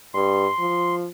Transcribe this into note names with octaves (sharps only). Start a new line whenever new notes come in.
G2 C6
F3